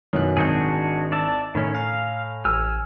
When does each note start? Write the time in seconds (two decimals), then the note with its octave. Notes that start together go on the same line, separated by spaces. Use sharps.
0.13 F#2 B2 D#3 E4 F#6
0.37 G#1 D4 F#4 G#4 G6
1.12 D5 E5 A5
1.55 A2 D#3 C#4
1.75 F5 G#5 A#5
2.45 A1 G#5 E6 F6